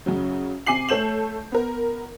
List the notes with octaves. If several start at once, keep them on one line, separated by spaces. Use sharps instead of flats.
F#2 C#3 F#3
C3 G#5 D6 C7 F#7
A3 A4 C#5 G6 E7 F#7
B3 A#4